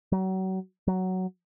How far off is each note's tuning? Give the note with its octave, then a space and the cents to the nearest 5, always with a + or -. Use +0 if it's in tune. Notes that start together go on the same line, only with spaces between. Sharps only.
F#3 +35
F#3 +10